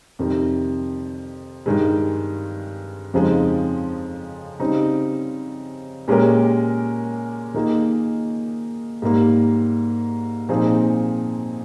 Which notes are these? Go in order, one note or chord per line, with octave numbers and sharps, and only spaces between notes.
F2 C3 D#3 G3
G2 D#3 G#3
F2 C#3 F3 G#3 D#4
C#3 G3 C4 D#4
A#2 G#3 C#4 G4 A#4
D#3 A#3 F4 G#4 D#5
G#2 G3 A#3
A#2 F3 C4 D#4 G#4